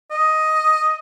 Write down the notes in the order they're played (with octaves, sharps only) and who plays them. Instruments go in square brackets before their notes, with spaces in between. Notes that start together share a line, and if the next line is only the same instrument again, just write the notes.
[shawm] D#5